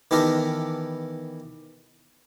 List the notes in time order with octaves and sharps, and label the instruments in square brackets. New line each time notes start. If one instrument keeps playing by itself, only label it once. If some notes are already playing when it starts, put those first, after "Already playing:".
[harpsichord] D#3 E3 B3 G4 A4 A#4